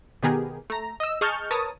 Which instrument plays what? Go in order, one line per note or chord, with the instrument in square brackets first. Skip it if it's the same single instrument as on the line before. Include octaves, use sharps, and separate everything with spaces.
[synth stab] B2 D#3 B3 G4 G#4 A#4
A3 A#5
D#5 E6
G#4 D#5 A5 C#6 F6 G6
A#4 B4 C#5 A5 D#6